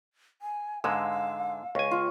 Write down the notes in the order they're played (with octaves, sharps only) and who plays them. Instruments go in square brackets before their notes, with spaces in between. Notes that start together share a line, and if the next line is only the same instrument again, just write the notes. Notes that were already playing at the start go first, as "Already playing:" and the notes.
[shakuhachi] G#5
[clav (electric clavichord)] G#2 D3 G#3 [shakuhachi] F5 [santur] E6
[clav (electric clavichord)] C#2 G#5 [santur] C#5
[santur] F4